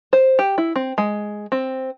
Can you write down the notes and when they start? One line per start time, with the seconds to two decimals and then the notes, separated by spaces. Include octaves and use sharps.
0.13 C5
0.39 G4
0.58 E4
0.76 C4
0.98 G#3
1.52 C4